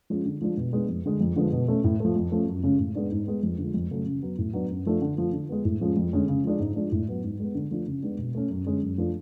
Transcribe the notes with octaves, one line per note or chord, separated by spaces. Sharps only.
F3 G#3 C#4
D3
F3 G#3 D4
B2
G#3 B3 D4
F2
D3 G#3
F2
D3 F3 G#3 B3
B2
A3 C#4
A2
F3 A3
F2
F3 A3 C#4
F#2
C#3 G#3 C#4
A2
G#3 B3 D4
G#2
G#3 B3
F2
D3 F3 G#3
F2
C#3 F#3 A3 C#4
C#3
F#3 B3
A2
F#3 B3 D4
F#2
F3 A3 D4
D3
F3 A3
D3
G#3 B3
A2
F3 G#3 C#4
F2
D3 G#3 C#4
C#3
F3 G#3 D4
G#2
F3 G#3 D4
A2
F#3 B3
G#2
G#3 B3
D3
F3 A3 D4
C#3
G#3 B3 D4
B2
A3 C#4
F#2
D3 G#3 C#4
F#2
F3 A3 D4